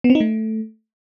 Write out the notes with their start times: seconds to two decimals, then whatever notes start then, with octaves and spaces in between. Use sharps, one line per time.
0.04 B3
0.10 C4
0.15 D#4
0.20 A3